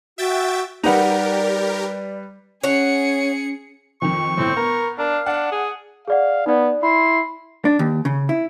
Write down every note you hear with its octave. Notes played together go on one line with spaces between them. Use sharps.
F#4 E5 G5 A6
G3 D#4 G4 A#4 B4 D5 F#5 F7
C#4 G#4 C#5 F#5 C#7
F2 D#3 C#6
G1 A2 C4 G6
B3 A#4
D4 A#4 F5
D4 F#5
G#4
G#4 D5 F5 F#5
B3 D#4 D5
E4 B5 C6
D4
D#2
C#3
E4